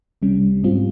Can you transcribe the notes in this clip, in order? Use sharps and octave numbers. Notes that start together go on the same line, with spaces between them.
C2 C3 G3 C#4
G#2 G3 C4 F4